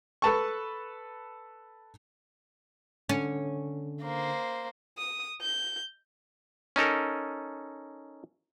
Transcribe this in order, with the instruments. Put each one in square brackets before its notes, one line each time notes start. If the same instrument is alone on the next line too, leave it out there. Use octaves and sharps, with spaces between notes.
[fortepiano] A4 B4 A5 C#6
[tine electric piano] D3 [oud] C#4
[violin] A#3 C5
D#6
G6
[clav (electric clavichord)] C#4 D#4 A4 A#4